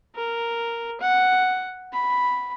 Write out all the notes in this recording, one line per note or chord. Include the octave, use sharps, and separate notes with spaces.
A#4
F#5
B5